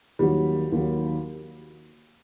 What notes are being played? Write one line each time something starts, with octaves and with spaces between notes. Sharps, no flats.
D#2 D#3 F#3 G3
D#2 D#3 F#3